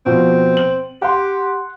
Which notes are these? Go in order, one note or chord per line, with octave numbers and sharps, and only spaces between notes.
B2 F3 C4
F#7
G4 F#5 C6